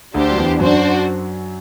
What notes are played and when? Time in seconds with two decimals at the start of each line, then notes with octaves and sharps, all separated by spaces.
0.14 D2 D3 D4 G4 C5
0.32 F#3
0.38 E2 E3
0.59 F#2 F#3 D4 F#4 C5